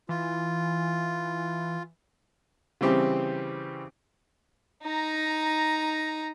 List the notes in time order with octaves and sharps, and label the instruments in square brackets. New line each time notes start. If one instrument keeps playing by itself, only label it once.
[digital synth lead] E3 [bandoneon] F4
[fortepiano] C#3 E3 G3 C4 G4
[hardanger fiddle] D#4 A#5